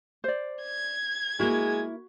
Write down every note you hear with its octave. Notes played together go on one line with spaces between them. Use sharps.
C5 D5
G#6
G#3 A#3 E4 F#4